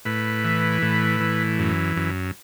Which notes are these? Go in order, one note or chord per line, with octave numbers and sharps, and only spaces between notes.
A2 B4
E3
A2
E3
F#2
F#2